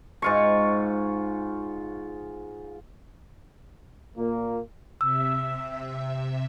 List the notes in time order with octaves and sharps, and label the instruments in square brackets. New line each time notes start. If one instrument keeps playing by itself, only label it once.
[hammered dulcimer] G#2 F4 C#6
[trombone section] A#2 A#3
[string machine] C3 E5 [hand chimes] E6